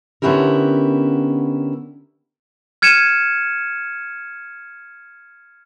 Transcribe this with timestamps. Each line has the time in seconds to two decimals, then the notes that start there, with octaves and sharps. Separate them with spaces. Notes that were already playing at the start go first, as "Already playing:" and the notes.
0.22 D3 B3 C#4 E4 G4 A#4
2.82 F6 G#6 C#7 D#7 E7